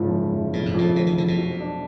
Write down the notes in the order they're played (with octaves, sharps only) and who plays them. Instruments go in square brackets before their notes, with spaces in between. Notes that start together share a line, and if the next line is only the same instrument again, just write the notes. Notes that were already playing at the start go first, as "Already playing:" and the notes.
Already playing: [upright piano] F#1 F3 [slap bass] G#2
[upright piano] F#1
F#1
[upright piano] F1 [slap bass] A#2
[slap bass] G#2
[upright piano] F2 [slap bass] A#2
[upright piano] F1 [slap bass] B2
[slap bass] D#3
[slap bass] D3 [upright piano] F3
[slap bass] B2
[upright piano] F#3
D4